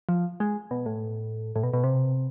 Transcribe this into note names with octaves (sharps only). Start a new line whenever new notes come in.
F3
G#3
B2
A2
A2
B2
B2
C3